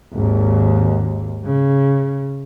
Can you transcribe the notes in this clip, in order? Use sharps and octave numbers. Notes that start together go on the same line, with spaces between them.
G#1 D#2
C#3